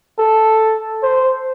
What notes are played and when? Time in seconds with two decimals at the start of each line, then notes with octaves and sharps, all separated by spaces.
0.19 A4
1.03 C5